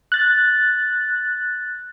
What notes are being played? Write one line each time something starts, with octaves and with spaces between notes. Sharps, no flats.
F#6 A6